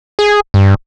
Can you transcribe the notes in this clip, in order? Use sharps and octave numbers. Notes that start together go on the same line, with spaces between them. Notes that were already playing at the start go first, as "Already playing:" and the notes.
G#4
G2